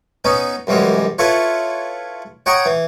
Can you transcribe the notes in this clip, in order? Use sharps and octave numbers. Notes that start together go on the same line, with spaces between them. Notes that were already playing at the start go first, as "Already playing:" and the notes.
B3 C#4 D#4
C2 F#2 E3 G3 G#3
E4 F4 A4 B4 C#5
C#5 F#5 G5 A#5 C#6 D#6
E3